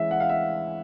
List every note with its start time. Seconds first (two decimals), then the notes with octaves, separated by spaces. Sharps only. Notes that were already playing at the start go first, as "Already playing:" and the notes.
Already playing: E3 G#3 C#4 E4 E5
0.11 F#5
0.20 F5
0.29 E5